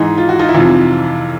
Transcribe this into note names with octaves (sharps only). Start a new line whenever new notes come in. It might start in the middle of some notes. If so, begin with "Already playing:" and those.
Already playing: G#2 E3 D#4
F4
F#4
D#4 F4
E4
F2 C3 E3 D#4 F4